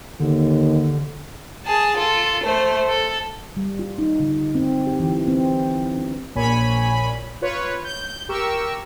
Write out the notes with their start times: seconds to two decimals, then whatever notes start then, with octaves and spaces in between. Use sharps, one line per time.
0.20 D#2 D3
1.66 G#4 A5
1.97 F4 A4
2.44 A3 C5
2.88 A4
3.57 G3
3.79 F4
3.98 D#4
4.20 D3
4.55 C4
4.87 G4
5.00 E3
5.28 C4
5.98 D4
6.35 A#1 A#2 C#5 G#5 B5
7.41 F4 B4 C#5
7.85 G6
8.29 G4 A#4 C#6 E6